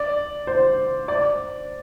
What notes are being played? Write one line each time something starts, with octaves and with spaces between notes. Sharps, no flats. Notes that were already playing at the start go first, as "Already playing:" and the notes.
Already playing: D5
C5
D5